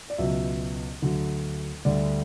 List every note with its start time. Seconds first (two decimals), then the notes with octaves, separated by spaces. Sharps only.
0.10 D5
0.18 C#2 B2 F#3 E5
1.02 D2 D3 F#3
1.85 D2 D3 G3 D5